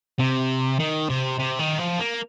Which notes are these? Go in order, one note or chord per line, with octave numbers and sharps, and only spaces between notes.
C3
D#3
C3
C3
D#3
F3
A#3